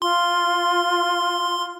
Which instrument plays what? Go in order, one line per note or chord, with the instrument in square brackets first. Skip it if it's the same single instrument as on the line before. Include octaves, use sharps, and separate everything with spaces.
[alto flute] F4 [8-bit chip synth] C6